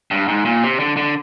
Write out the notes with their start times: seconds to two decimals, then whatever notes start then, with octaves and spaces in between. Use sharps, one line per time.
0.11 G2
0.28 G#2
0.45 A#2
0.63 C3
0.80 D3
0.97 D3